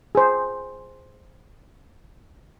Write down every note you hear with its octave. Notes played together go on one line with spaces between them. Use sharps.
G#4 C5